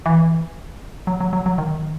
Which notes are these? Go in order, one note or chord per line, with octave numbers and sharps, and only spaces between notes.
E3
F#3
F#3
F#3
F#3
D#3